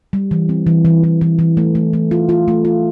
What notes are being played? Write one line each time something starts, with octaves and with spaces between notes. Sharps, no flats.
G3
E3
C4
E3
E3
E3
E3
E3
A3
A3
A3
F4
F4
A3
F4